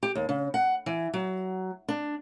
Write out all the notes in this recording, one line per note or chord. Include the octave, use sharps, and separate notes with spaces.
G4
D#2
C#3
F#5
E3
F#3
D4